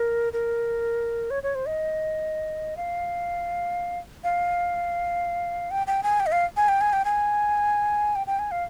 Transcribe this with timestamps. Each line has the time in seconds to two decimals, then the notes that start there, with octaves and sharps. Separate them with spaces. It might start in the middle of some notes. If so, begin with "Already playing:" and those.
Already playing: A#4
0.33 A#4
1.31 C#5
1.43 C#5
1.55 C5
1.67 D#5
2.77 F5
4.24 F5
5.71 G5
5.87 G5
6.03 G#5
6.20 G5
6.26 D#5
6.32 F5
6.57 G#5
6.69 G5
6.81 G#5
6.93 G5
7.05 G#5
8.15 G5
8.27 G5
8.39 G#5
8.51 F5